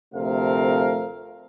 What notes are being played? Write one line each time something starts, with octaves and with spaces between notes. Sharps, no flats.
D2 C3 F3 A3 A#4 F5